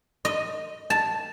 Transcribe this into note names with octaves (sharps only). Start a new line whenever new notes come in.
D#5
A5